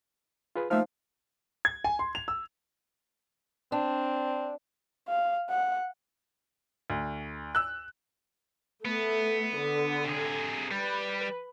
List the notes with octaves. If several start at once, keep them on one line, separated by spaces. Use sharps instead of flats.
F4 G#4 B4
F3 A3 A#3 D#4 E5 F6
G#6
G#5
C6
F7
E6
C4 D4
F5
F#5
D2
E6 F#6
A3 B3
D3
C3 G#4
G3 B4